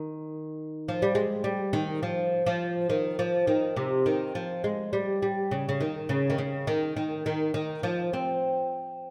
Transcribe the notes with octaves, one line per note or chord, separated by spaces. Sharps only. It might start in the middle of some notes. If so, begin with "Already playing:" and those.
Already playing: D#3
F3
G3
G#3
G3
D#3
F3
F3
D#3
F3
D#3
C3
D#3
F3
G#3
G3
G3
C#3
C#3
D#3
C#3
D#3
C#3
D#3
D#3
D#3
D#3
F3
C4